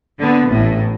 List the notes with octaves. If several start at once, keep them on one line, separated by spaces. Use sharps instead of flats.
D3 B3
A1 A2